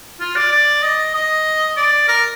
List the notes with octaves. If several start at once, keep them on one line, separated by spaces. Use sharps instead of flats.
F4
D5
D5
D#5
D#5
D5
A#4